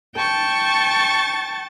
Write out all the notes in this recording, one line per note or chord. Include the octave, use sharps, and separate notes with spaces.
G5 A5 C#6 A6